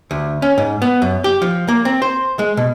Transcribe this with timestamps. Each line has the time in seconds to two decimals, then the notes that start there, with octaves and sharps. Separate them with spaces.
0.11 D2
0.42 C#4
0.58 G#2
0.82 B3
1.02 F#2
1.24 G4
1.42 F3
1.68 A#3
1.85 C4
2.02 C5
2.39 G#3
2.57 B2